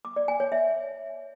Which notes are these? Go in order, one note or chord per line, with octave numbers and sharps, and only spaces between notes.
D6
D5
G#5
C#5
E5